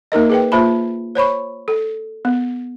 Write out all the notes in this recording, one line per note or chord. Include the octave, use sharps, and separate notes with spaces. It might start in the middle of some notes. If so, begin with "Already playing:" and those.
A#3 D#4 A#4 D#5
G#4 B4 G5
A#3 F4 C5 A5 B5
C5 C#5 B5 C#6
A4
B3